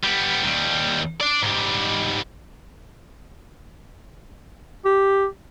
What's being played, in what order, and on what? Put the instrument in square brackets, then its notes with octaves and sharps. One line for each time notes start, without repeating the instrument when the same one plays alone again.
[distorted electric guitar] G3 B3
D#2 G3
D4 D5
G#2 G3
[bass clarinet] G4